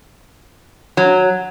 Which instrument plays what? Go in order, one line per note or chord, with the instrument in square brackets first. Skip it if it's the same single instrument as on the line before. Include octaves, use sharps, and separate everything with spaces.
[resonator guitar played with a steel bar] F#3